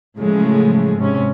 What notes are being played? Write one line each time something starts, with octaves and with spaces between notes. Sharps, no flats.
A2 C#3 F3 F#3 G#3 A3
G#2 C3 C#4